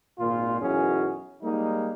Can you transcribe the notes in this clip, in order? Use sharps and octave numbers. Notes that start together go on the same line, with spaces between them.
G#1 A#2 F4
B1 F#2 E3 C#4 F#4 G#4
G3 G#3 A#3 D#4